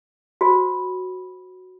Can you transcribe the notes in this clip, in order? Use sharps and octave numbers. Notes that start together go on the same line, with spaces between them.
F#4 C5 B5